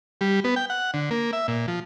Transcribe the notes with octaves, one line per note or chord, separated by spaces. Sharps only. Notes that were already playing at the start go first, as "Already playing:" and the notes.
G3
B3
G5
F#5
D3
A#3
E5
A#2
F3